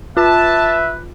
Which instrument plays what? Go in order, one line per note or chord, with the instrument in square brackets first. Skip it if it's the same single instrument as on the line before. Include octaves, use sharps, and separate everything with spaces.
[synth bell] F4 [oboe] B4 [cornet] E5 [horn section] A5